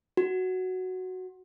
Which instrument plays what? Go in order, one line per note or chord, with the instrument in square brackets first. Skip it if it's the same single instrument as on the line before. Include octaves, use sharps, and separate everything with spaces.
[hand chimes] F#4